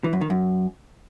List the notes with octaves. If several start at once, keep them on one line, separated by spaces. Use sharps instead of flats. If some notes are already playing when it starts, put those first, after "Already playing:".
E3
F#2
D#3
F#2